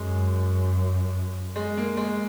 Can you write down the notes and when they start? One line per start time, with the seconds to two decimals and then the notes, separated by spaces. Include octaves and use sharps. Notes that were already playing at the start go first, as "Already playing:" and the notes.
Already playing: F#2 G#3
1.56 G#3
1.77 A#3
1.97 G#3